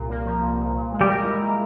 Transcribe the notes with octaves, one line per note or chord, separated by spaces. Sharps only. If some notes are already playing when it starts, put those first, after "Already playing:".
Already playing: C2 A#2
A#3
F3
C2
A#2
A#2
G#3
G3 G4
A#4
E4
A#2